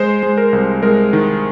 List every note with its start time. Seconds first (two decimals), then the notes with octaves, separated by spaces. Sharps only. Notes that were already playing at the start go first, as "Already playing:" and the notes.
Already playing: G#3 C5
0.23 G#3
0.38 A#4
0.53 C2
0.82 G#3 A#4
1.13 D#3